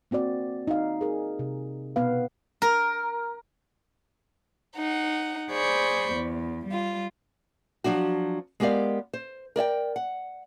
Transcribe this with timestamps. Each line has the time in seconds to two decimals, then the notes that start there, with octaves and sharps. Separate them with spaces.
0.11 A#3 C4 F#4 D5
0.67 D#4 F5
1.01 G#4 A#4
1.39 C3
1.96 B2 B3 B4 F5
2.62 A#4
4.76 D#4 F#5
5.53 G#4 C5 D5 B5 C#6 G6
6.15 E2
6.68 G3 F4
7.84 F3 F#3 D4 F#4
8.60 G#3 B3 G4 A#4 D5 F5
9.13 C5
9.56 A#4 D5 E5 G5
9.96 F#5